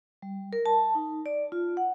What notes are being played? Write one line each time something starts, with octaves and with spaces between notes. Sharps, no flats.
G3
A#4
A5
D#4
D5
F4
F#5